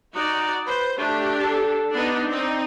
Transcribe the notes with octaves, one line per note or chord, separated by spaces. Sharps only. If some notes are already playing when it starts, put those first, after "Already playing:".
D#4 F#4 D5
B4 C5
A3 D4 G4
A4
B3 D4 D#4
C4 D#4 D5